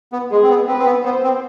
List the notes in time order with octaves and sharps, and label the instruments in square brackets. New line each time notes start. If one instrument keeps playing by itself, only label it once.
[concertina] B3
[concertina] G#3 [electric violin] G#4
[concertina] C4
B3
[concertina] C4 [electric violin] B4
[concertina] C4
B3
[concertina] B3 [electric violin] C5
[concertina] C4